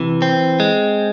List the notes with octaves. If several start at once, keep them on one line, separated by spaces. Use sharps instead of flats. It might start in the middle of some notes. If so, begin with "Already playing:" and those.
Already playing: C3 E3
C4
G#3